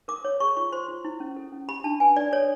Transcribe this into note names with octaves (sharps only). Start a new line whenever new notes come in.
A#4 D6
C#5
G#4 C#6
F4 C#6
C5 C6
F4
E4
C#4
A4
C#4
G4 B5
D4 A5
B4 G#5
D4 D5
A4 C#5